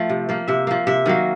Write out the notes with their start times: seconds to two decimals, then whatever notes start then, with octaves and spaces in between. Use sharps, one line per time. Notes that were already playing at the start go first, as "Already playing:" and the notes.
Already playing: F3 A3
0.09 C3
0.29 F3 A#3
0.48 C3 E5
0.67 F3 A#3
0.87 C3 E5
1.06 D#3 F#3 A#3